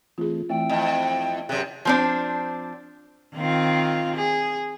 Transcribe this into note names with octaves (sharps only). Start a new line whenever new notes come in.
E3 A3 C4 F4 G#4
E3 A3 C4 E4 E5 G5
F2 D#5
F#2 C3 G#4 F#6
F3 C4 D4
D#3 C4 F4
G#4